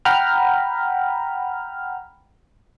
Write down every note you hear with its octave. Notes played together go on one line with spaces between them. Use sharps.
F#5 G5 A#5 B5 F6